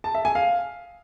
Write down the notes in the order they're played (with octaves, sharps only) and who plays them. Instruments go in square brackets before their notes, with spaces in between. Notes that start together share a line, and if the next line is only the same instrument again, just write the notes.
[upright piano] A5
E5
G#5
F5